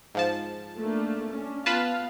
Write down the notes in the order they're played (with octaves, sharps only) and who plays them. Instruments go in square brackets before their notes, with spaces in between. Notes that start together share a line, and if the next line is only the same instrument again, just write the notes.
[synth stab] G#2 F3 A5
[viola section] A3 A#3 D4
C#4 D4
[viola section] B3 F5 [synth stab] F4 B4 A5